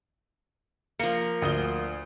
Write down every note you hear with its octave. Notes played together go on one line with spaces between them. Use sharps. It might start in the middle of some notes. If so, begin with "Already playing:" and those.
F3 A#3 C#7
D2 D#6 G7